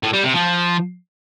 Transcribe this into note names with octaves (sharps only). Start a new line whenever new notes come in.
A2
G3
C3
F3